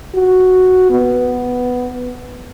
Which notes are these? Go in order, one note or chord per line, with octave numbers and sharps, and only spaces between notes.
F#4
B3